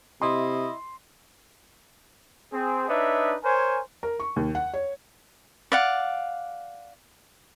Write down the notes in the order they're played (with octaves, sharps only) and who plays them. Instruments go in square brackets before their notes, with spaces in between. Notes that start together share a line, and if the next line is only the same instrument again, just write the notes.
[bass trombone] C3 [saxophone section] E4 D#5 [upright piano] C6
[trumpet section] C4 G#4
D4 D#4 B4 C#5 D#5 E5
A#4 C5 C#5 G#5
[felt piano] A#4
C#6
D#2
F#5
C#5
[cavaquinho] D5 F5 F#5